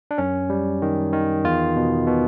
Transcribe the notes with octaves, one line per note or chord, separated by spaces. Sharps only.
D4
F#2 C#4
G3
D#3
D#3
E2 F4
B2
B2